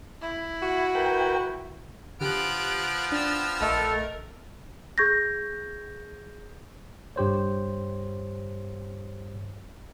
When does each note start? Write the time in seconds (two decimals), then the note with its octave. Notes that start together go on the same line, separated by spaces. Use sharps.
0.21 E4
0.62 F#4
0.95 A#4 B4 G5
2.21 D3 F3 B3 G4 F6 F#6 D7
3.12 D4 G5 E6 A6
3.61 A#1 A3 A4 A#4 D#5 E5
4.98 G#4 C#6 G6 G#6 A#6
7.16 G2 G4 C5 C#5